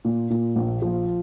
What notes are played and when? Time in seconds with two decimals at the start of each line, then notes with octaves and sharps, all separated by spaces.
0.05 A#2
0.30 A#2
0.56 A#1
0.82 F3